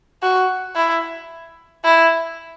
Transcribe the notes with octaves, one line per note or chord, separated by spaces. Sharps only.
F#4
E4
E4